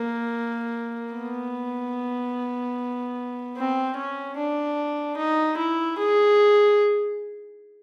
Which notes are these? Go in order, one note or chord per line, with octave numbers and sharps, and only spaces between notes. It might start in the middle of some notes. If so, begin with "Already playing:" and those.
Already playing: A#3
B3
C4
C#4
D4
D#4
E4
G#4